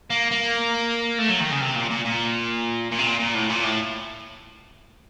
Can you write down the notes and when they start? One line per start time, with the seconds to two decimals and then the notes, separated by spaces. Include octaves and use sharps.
0.10 A#3
0.31 A#3
1.19 A3
1.29 F#3
1.40 D#3
1.51 C#3
1.61 C3
1.76 A#2
1.90 A#2
2.05 A#2
2.92 A#2
2.99 C3
3.07 A#2
3.20 A#2
3.35 A2
3.50 A#2
3.64 A2